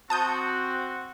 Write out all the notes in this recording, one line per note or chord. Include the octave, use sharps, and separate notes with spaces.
C4 F#4 A5 D#6 G6